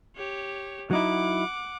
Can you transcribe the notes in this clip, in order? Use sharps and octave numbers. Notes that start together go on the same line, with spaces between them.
G4 C#5
F#3 D#4 E4 F#5 D6